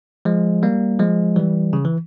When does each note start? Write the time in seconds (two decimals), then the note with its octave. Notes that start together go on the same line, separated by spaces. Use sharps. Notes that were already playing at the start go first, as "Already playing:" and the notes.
0.25 F3 G#3
0.63 G3 A#3
0.99 F3 G#3
1.36 E3 G3
1.73 C#3
1.85 E3